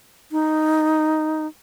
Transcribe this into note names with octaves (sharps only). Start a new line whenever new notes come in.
D#4